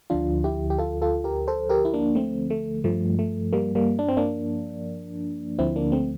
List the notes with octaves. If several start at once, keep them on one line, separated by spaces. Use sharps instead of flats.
D2 D3 F3 D4 F4
E4 G4
G4
F4 A4
F4 A4
G4 A#4
A4 C5
G4 A#4
E4
A#3 D4
A3 C4
A3
G2 F3 A3
A3
G3 A#3
G3 A#3
D4
C4
A#3 D4
D2 D3 F3 C4 E4
A#3 D4
A3 C4